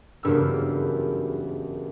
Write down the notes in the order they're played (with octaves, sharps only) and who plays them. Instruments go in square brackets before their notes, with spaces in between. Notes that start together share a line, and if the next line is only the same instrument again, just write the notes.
[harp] F#1 E2 G2 E6